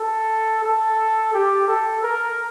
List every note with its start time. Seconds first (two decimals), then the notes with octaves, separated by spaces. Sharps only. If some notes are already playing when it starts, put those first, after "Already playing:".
Already playing: A4
0.63 A4
1.33 G4
1.68 A4
2.03 A#4